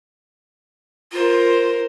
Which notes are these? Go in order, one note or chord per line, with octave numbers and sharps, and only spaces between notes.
F4 A#4 C5